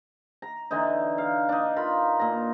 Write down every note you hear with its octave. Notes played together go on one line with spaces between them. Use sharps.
A#5
D3 E3 D#4
F5
D4 D#4
F4 A#4 B5
A#2 A#5